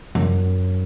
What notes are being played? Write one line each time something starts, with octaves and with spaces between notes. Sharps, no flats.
F#2